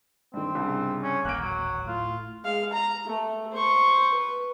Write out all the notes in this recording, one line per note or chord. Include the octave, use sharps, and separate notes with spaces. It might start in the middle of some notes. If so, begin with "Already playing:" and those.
G2 D#3 C4
C2 G2 C#3
C#4
D1 G#1 A#3 F#6 D7
F#3
A2 F4
G#3 F5
A#5
A3
C5 C#6
B4